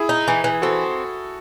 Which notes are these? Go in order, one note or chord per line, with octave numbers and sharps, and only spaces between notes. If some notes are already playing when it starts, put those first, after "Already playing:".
Already playing: E4 G#4
D#4
E3
E3
C4 F#4 A4